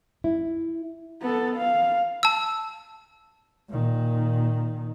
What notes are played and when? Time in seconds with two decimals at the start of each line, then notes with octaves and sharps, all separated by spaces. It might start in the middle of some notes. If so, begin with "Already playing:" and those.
0.24 E4
1.22 B3 A4
1.56 F5
2.23 A5 E6
3.68 A#2 D#3